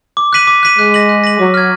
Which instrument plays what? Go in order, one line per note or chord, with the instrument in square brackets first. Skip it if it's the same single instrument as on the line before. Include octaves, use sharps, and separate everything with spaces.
[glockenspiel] D6
F#6 B6 D#7 F#7
D6
F#6 B6 D#7 F#7
[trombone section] G#3 [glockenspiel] F#6
[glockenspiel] A#6 D#7 F#7
F#6
A#6 D#7 F#7
[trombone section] F#3 [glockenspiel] D6
[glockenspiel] F6 G#6